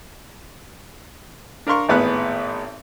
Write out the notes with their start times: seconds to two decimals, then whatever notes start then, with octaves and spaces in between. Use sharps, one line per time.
1.67 D4 A#4 F5 C6 C#6
1.89 G#1 A2 B3 G#4 F#6